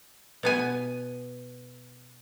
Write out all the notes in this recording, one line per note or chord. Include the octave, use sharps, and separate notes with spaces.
B2 B3 G#5